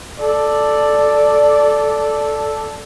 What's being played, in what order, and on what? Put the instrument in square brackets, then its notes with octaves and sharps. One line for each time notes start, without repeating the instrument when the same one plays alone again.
[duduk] A4 [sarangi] D5